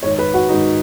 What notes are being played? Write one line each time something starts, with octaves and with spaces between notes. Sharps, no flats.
G#2 D#3 C#5
B4
F#4
G#2 D#3 D#4